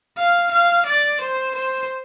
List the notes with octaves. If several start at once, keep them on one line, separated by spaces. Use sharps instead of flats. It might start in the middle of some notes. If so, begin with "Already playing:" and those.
F5
F5
D5
C5
C5